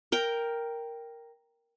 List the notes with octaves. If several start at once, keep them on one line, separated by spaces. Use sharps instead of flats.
A#4 G5